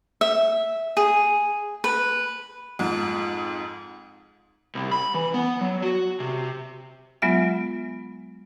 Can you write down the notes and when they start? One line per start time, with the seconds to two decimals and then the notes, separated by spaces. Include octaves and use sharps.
0.21 E5
0.97 G#4
1.84 B4
2.79 F2 G#2 F3
4.75 C2
4.91 B5
5.14 E3
5.34 B3
5.61 F#3
5.82 F#4
6.20 C3
7.22 F#3 G#3 B3 F4 E5